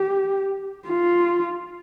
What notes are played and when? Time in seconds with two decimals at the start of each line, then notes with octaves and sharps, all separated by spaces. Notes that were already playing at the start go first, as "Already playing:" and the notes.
Already playing: G4
0.88 F4